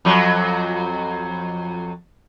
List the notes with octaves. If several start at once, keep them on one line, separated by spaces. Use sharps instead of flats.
F2 F#3